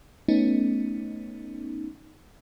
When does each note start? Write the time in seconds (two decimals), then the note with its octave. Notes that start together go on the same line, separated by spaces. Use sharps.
0.28 A3 B3 C#4 D#4